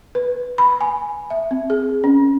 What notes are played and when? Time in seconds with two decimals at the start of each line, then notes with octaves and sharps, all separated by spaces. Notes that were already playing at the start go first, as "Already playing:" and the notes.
0.15 B4
0.58 B5
0.81 G#5
1.30 E5
1.51 C4
1.70 G#4
2.04 C#4